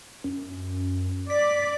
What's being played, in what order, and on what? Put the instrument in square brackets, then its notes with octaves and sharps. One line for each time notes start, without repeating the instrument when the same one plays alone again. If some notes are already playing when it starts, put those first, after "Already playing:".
[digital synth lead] F#2
[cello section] D5 [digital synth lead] B6